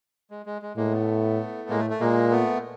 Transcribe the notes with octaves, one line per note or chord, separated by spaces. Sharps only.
G#3
G#3
G#3
A2 G#3 A#3
A3 B3
A2 G#3 A#3
A3
A3
A#2 G#3 A#3
A3 B3